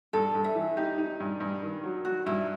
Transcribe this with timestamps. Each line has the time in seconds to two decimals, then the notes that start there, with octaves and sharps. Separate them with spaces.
0.13 G2 A4
0.35 G2
0.44 E5
0.55 E3
0.77 D#4 G4
0.98 D#4
1.20 G2
1.40 G2
1.63 D#3
1.84 F#3
2.05 F#3 F#4
2.26 G2 E4